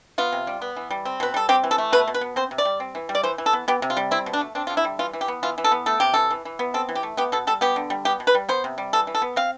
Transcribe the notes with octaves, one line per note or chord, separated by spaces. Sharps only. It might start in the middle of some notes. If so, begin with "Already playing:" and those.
B3 F4
C3
G3
B3
E3
G3
C4
B2 B4
G3 A4
C4 G4
E3
A4
A3
B2 B4
B2
B4
B3
C4 C5
C3
D5
G3
C4
E3
G3
D5
E3 C5
E3
A4
B3
B3 G4
C3
F4
G3
C4 E4
B2
D4
A3
C4 D4
D3 F4
E4
G3
E3 F4
E3
G4
B3
E3 F4
E3
A4
B3
A3 A4
C3 G4
E3 A4
E3
E3
B3
C4 A4
E3
G4
A3
B3 G4
B2 A4
G3 A4
B3 G4
D3
G3
B3 G4
B2
B4
G3
B3 C5
C3
G3
E3 A4
E3
A4
B3
C4 F5